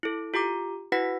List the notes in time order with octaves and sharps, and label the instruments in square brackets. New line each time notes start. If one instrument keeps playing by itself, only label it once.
[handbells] E4 A4
F4 G4 A#5 D6
E4 F#4 B4 F#5 A#6 B6